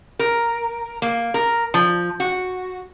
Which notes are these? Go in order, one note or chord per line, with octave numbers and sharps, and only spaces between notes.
A#4
A#3
A#4
F3
F#4